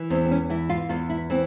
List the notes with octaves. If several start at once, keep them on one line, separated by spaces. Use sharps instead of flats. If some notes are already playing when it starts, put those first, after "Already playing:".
Already playing: E3
E2 C4
C4
C#4
E3 E4
F4
E2 F4
E4
E3 C4